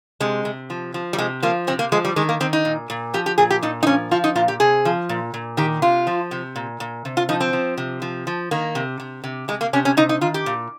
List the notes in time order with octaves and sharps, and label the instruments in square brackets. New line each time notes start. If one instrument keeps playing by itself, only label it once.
[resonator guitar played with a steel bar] C3 G#3
C3
F3
F3
G3
C3 G#3
F3 A#3
C3 C4
A#3
F3 G#3
G3
D#3 G#3
A#3
D#3 C4
D#4
A#2
A#2
F3 G4
G4
A#2 G#4
G4
A#2 D#4
D#4
F3 C#4
F3 F4
D#4
A#2 F4
G4
C3 G#4
F3
A#2
A#2
D#3 G4
C3 F4
F3
C3
A#2
A#2
C3
F4
F3 D#4
C4
F3
C3
F3
F3
D#3 A#3
C3
C3
C3
C3 G#3
A#3
C3 C#4
C#4
C3 D#4
D#4
D#3 F4
G4
A#2